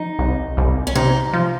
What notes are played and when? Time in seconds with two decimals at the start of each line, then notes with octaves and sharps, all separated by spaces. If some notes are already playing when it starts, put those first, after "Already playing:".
Already playing: F3 D#4
0.19 C2
0.57 C2
0.87 C#4
0.95 C3 D#4
1.33 F3